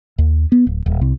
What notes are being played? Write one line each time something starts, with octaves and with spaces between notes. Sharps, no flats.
D#2
B3
D1
D#1
C2